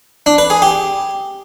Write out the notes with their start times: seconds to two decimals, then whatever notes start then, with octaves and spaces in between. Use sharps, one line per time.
0.26 D4
0.38 B4
0.50 G#4
0.62 G4